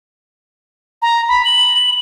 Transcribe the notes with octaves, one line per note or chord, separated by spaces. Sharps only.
A#5
B5
F#7